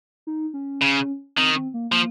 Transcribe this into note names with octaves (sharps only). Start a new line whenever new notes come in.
D#4
C#4
C#3
D#3 C4
C4
A#3
F3 A#3